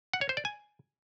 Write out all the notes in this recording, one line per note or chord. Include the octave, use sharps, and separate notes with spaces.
F#5
C#5
C5
D5
G#5